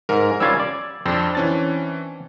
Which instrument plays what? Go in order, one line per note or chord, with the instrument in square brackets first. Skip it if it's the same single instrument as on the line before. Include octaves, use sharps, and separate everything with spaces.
[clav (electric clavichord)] G#2 [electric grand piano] A#4
[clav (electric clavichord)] G3 C#4 F4 [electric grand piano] E6 G#6 A6
[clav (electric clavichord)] D5
[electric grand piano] F2 [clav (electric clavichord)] C4 D4
[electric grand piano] E3 C#4 A6